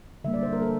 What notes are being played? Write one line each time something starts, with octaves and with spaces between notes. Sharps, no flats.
D3 G3 A#3 E5
D5
C5
A#4
A4